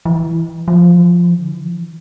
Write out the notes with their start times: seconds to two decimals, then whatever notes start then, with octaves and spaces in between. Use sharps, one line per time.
0.05 E3
0.68 F3
1.29 E3
1.39 D3
1.49 E3
1.60 F3